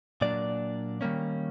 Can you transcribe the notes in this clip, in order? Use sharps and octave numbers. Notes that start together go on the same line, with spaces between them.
A#2 F#3 A#3 D4 D5
D#3 G3 A#3 C#4